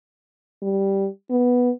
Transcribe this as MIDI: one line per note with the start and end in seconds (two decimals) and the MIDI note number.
0.62 1.07 55
1.30 1.71 59